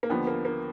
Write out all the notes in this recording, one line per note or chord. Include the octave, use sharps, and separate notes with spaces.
A#3
D#2 D3 F3 B3
A#3
A#3